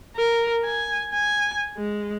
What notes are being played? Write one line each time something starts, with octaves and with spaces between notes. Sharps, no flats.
A#4
G#5
G#5
G#3